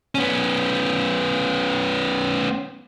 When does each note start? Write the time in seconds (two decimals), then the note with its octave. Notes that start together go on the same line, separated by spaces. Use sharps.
0.15 B3 C#4